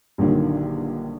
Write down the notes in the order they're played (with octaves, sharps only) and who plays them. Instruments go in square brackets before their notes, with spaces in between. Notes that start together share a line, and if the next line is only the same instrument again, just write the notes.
[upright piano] A#1 G2 A#2 D3 D#3 F#3